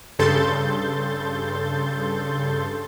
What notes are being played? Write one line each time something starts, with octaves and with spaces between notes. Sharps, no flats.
G2 C#3 A4 C6 G6 A6